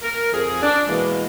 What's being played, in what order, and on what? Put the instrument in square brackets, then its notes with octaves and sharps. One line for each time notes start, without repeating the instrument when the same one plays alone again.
[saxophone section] A#4
F2 G#4
D4
B2 E3 G#3 A#3